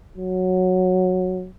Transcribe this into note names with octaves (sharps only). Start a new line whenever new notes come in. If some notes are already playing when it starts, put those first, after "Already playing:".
F#3